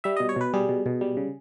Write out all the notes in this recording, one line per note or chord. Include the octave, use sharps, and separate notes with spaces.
G3 E5
B2 D#5
C#5
B2 B4
G3 G#4
B2
B2
G3
C#3